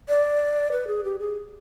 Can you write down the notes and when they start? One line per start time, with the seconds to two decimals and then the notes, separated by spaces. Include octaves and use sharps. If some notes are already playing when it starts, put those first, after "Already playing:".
0.09 D5
0.72 B4
0.87 G#4
1.04 G4
1.19 G#4